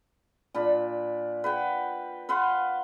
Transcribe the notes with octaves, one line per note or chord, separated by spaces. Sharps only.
A#2 D4 B5
B4 F#5 G5
B4 F5 F#5 C6